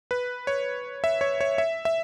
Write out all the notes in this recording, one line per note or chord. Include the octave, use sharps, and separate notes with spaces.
B4
C#5
E5
C#5
C#5
E5
E5